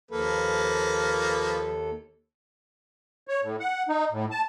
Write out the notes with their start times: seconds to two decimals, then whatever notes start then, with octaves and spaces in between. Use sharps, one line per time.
0.11 D#2 F3 A#3 A4 B4
3.28 C#5
3.42 A2
3.60 F#5
3.89 D#4
4.11 A2
4.31 A5